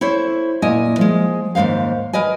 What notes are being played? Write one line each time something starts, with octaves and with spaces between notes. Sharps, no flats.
E4 A4 C5 C#5
A#2 E4 D#5 G#5
F3 G#3
D#2 G#2 B2 C5 F5
A#4 B4 D#5 G#5